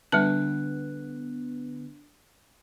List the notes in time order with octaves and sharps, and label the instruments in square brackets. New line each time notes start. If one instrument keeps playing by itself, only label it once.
[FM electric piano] D3 B3 [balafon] G3 A5 [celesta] D4 F#6